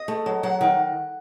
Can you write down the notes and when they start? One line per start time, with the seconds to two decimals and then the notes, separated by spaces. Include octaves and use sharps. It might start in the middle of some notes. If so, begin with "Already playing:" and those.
Already playing: D#5
0.08 A3
0.26 F#3
0.43 F#3 F#5
0.61 D#3